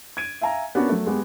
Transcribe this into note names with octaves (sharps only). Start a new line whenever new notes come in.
G#6 D7 D#7
E5 F5 G#5 A#5
B3 C#4 D4 F#4 A#4
F#3 A3
G#3 B3 G4